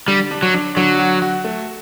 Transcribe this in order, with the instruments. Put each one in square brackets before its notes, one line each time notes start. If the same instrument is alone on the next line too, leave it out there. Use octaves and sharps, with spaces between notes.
[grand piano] D3 [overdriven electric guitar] G3
[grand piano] D4
[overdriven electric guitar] F#3
[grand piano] D4
[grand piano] D3 [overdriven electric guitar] F#3
[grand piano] F#4
F#4
A3